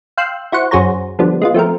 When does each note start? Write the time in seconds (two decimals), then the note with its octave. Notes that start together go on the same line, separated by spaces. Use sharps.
0.17 F5 G5 C6 E6 F#6
0.52 E4 F#4 C5 F#5 C#6
0.71 F#2 F#4 G#4 C5 C#5 A#5
1.19 D3 F3 G3 B3
1.42 G#3 B3 F4
1.54 F3 A3 C4 A#4